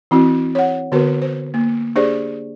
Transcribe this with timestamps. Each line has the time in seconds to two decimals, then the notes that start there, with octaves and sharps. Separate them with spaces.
0.11 E3 C4 E4 F#4
0.55 C#5 F#5
0.92 D3 B3 F#4 A#4 B4
1.22 C5
1.54 A#3
1.96 D4 G4 G#4 C5 D5